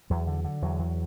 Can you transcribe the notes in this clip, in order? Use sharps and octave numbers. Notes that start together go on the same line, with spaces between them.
E2 F#3
D3
D3
E2 F#3
E2